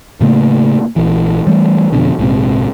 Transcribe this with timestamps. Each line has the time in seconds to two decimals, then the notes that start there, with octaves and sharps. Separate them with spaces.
0.20 A2 C#3 A3 A#3
0.96 A#1 E3
1.47 E3 G3 A3
1.92 F2 G#2 B2 D3
2.19 A#1 G#2 C3